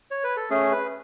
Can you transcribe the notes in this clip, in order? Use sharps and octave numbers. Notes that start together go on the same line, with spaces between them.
C#5
B4
A4
A3 C#4 G#4
B4